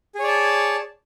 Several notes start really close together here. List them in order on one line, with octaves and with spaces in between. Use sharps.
G#4 C#5 D5 A5